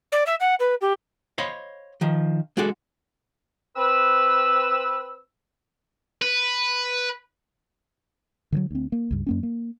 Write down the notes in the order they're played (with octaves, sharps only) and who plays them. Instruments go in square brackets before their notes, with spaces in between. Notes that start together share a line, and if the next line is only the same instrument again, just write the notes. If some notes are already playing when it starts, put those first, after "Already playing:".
[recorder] D5
E5
F#5
B4
G4
[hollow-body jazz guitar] C5 C#5 D#5 F5 B5 C6
D#3 F3
G#3 D4 F#4 G#4 A4
[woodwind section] C4 B4 E6
[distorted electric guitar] B4
[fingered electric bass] D3 E3 F#3
D2 C4
A#3
C#2 G2
F#2 A#3 C#4
A#3